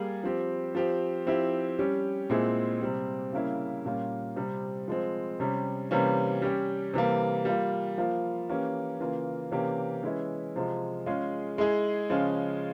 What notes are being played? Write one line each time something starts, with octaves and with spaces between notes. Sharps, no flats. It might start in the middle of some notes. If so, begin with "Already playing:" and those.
Already playing: G3 A#3 G#4
F3 C4 G4
F3 C4 G4
F3 C4 E4 G4
G3 C#4 G4
A#2 G#3 C4 E4 G#4
C3 G3 C4
C#3 G3 A#3 C#4 E4
A#2 G3 A#3 C#4 F4
C3 G3 C4
F3 G#3 C4
C3 G3 C#4
C3 E3 G3 A#3 C#4
G3 C#4 G4
C3 E3 G3 A#3
G3 A#3 F4
F3 A#3 F4
E3 A#3 C#4 G4
C#3 E3 A#3 F4
C3 E3 A#3 C#4 G4
E3 G#3 C#4 E4
C3 F3 G#3
G#3 C#4 F4 G#4
G#3 E4 G#4
C#3 F3 G#3 C#4 F4